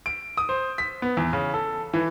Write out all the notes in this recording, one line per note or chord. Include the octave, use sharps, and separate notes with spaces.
D7
D#6
C5
B6
B3
E2
C#3
A4
E3